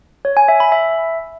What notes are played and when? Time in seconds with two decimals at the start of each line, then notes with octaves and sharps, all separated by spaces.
0.25 C#5
0.37 G#5
0.48 E5
0.60 B5
0.72 E5